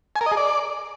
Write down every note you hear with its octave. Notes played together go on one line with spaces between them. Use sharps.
G#5
A#4
D#5
G#4
D5